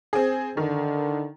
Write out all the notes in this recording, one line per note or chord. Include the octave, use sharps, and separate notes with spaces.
C4 G#4
D3 D#3